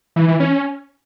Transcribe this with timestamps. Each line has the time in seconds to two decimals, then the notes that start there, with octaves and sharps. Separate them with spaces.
0.16 E3
0.28 E3
0.40 C#4